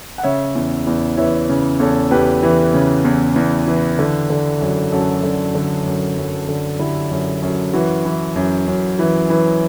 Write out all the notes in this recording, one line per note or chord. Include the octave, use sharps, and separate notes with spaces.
F#5
C#3 C#5 E5
E2
E2
E3 C#5 E5
C#3
E2 A4 C#5
E2 G4 B4
E3
C#3
E2
E2
E3
D3
D3
F#2
F#2 F#4 A4
D3
D3
F#2
F#2
D3
D3 E4 G4
F#2
F#2
E3 F#4
E3
F#2
F#2
E3
E3